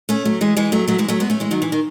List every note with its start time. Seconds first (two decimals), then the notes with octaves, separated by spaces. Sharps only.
0.09 A3 C#4
0.25 F#3 A3
0.41 E3 G#3
0.57 E3 G#3
0.72 F#3 A3
0.87 F#3 A3
0.98 E3 G#3
1.08 F#3 A3
1.20 G#3 B3
1.30 A3 C#4
1.40 E3 G#3
1.51 D#3 F#3
1.62 E3
1.72 D#3